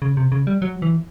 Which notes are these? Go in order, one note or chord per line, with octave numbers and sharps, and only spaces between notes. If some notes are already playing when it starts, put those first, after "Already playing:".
C#3
C3
C#3
G3
F#3
E3